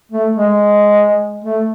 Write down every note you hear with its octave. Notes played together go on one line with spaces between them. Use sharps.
A3
G#3
A3